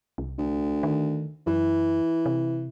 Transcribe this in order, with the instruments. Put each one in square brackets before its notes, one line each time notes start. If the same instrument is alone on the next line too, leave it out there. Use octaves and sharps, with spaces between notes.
[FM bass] C2
[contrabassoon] D2
[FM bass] D#3
[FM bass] F#2 [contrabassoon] E3
[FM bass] C3